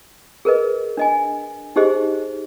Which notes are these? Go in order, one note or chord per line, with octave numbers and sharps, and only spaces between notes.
G#4 A#4 B4 D#5
D4 D#5 G#5
D#4 G4 G#4 C5 D#5